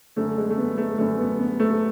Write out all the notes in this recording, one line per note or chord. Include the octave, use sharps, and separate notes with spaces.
F#2 D3 A3
G#3
A3
B3
A3
F#2 D3 A3
B3
B3
A3